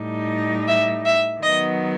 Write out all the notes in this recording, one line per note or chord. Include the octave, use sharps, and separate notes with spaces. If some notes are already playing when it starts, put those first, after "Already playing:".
Already playing: A2 G3 D#4
E5
E5
D#3 F#3 B3 D#5